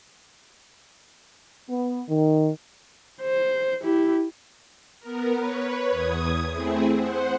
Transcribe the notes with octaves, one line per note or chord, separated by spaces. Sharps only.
B3
D#3
C5
E4 G4
B3 A#4
B4 C#5
E2 D#6 G#6
A3 C4 E4 G#4
C5 F#5